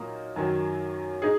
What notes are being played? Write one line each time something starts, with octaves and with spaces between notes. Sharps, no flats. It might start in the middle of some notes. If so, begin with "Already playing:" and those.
Already playing: A#2 F#3 A#3 D#4
F#2 D#3 F#3
D#4 G#4